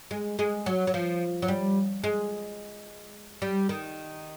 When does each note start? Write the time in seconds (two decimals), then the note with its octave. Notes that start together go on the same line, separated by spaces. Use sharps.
0.11 G#3
0.39 G#3
0.66 F#3
0.87 F#3
0.94 F3
1.42 F#3
1.48 G3
2.04 G#3
3.42 G3
3.69 D#3